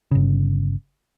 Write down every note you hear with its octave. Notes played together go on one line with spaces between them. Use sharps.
G1 C#3